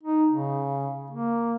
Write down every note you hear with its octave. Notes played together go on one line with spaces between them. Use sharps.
D#4
C#3
A#3